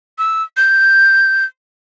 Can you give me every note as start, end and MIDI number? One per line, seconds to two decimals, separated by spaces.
0.18 0.43 88
0.57 1.45 91